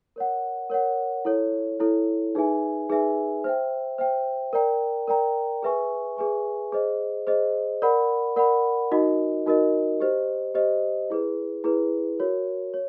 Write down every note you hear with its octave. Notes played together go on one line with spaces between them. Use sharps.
A#4 C#5 F#5
A#4 C#5 F#5
E4 A4 C#5
E4 A4 C#5
D#4 G#4 B4 E5 G#5
D#4 G#4 B4 E5 G#5
C5 E5 G5
C5 E5 G5
A#4 D5 G5 A#5
A#4 D5 G5 A#5
G#4 B4 E5 G#5 C#6
G#4 B4 E5 G#5 C#6
G#4 C5 D#5
G#4 C5 D#5
A#4 D5 F#5 B5
A#4 D5 F#5 B5
D#4 F#4 A#4 D#5
D#4 F#4 A#4 D#5
G4 C5 D#5
G4 C5 D#5
E4 G#4 B4
E4 G#4 B4
F#4 A#4 C#5
C#5